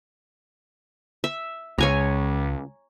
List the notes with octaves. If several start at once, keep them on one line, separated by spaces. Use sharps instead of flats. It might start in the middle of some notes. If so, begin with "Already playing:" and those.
E5
C#2 C#5 G#5 A#5